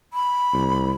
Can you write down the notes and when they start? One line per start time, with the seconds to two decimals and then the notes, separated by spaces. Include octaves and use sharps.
0.13 B5
0.53 C2